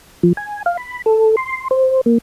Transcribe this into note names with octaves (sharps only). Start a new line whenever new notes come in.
F3
G#5
F5
B5
A4
C6
C5
A#3